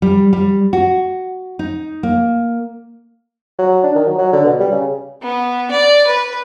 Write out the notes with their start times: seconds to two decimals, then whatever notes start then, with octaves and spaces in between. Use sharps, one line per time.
0.02 G3
0.33 G3
0.73 F#4
1.59 D#4
2.03 A#3
3.58 F#3
3.83 D4
3.95 D#3
4.07 F#3
4.18 F#3
4.33 D3
4.45 B2
4.60 G3
4.72 C#3
5.22 B3
5.71 D5
6.07 B4